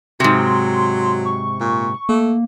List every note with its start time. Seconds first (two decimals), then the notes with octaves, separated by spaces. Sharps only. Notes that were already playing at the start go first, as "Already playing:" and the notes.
0.20 G#2 C3 F#3 C6
1.25 C#6
1.60 A#2
2.09 A3 A#3